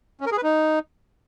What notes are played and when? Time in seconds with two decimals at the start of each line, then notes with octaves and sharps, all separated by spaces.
0.20 C#4
0.26 A#4
0.32 G#4
0.37 B4
0.43 D#4